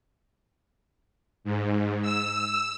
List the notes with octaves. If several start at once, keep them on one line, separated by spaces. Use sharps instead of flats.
G#2
E6